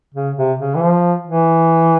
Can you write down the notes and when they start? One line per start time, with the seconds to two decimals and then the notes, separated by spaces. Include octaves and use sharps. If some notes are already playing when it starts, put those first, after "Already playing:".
0.14 C#3
0.37 C3
0.59 C#3
0.75 E3
0.82 F3
1.27 E3